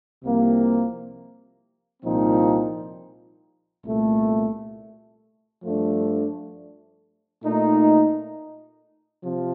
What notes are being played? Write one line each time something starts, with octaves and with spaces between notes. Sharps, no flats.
C2 C3 F3 A#3
C2 A#2 F3 C4 D#4
C2 A#2 A3
G2 F3 A3 D4
A#2 A3 D#4
C3 F3